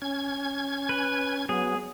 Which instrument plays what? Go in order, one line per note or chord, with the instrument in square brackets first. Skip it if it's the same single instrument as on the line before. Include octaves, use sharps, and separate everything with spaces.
[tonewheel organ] C#4 G#6
[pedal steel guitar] B4
[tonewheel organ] F#3 B3 [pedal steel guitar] G#4